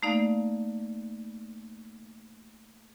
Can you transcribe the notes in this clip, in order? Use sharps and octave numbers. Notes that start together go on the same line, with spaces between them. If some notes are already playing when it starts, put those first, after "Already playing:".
A3 A#3 D#4 D5 F5